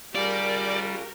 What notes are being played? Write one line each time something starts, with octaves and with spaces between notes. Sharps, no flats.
G3 F4 G4 G#4 A#4 D5